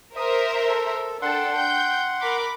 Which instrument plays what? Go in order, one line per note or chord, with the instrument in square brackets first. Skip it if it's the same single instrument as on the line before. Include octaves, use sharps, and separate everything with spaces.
[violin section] A#4 C5 E5 [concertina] D#6
[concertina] A4
[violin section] D4 A4 G5 [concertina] F#5 C6
[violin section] G5 G6
A#4 B5 D6